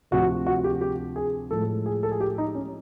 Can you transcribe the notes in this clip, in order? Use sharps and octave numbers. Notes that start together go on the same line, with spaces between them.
D2 C3 F3 F#4
F#4
G4
G4
G#4
A2 F3 G#3 A4
G#4
A4
G#4
G4
D#4
C#4